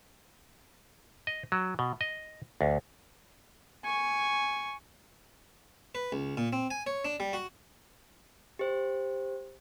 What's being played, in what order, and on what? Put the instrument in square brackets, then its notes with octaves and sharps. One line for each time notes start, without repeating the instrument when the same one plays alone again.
[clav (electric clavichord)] D#5
F#3
B2
D#5
D2
[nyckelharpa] G#5 C#6
[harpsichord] B4
C#2
A#2
C4
G#5
C#5
D4
G3
F#4
[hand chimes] G4 C5